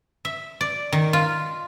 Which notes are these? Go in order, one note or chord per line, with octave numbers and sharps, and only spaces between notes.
E5
D5
D#3
F4